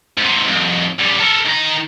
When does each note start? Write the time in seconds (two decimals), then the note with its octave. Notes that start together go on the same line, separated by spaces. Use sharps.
0.18 G#2 C3
0.48 C2 F2
0.99 F#2 G3
1.20 A4 A#4
1.46 D#3 A#5